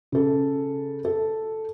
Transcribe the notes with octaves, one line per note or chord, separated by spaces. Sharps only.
C#3 A4
A4